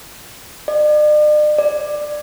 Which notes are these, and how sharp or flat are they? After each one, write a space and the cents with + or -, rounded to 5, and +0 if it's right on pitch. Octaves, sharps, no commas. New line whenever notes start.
D5 +45
D5 +15